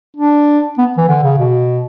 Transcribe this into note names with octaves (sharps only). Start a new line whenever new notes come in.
D4
B3
E3
D3
C#3
B2